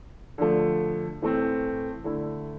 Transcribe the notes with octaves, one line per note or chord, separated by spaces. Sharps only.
D3 F3 A3
A2 E3 A3 C4
D3 A3 E4